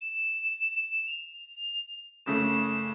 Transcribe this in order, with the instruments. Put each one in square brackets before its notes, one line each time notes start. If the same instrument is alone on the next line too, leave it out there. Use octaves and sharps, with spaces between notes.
[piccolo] E7
F7
[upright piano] F#1 C#3 A3 [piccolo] E7